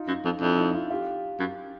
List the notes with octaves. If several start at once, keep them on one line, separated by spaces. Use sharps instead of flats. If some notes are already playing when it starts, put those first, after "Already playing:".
Already playing: D#4 F4
F#2
F2
F2 D4 E4
D#4 F4
D#4 F4
F4 G4
F#2